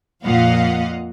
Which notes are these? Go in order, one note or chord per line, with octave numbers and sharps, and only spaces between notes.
F2 A#2 D#5 F5 F#5